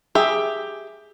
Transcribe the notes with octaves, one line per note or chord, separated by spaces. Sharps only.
G4 G#4 E5